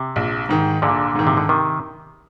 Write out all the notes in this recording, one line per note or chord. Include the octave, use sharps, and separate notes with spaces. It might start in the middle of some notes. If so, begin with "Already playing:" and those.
Already playing: C3
A#1
G#2 D#3
A#1 A#2 D3
G#2 D#3
C3
D3
C3 D#3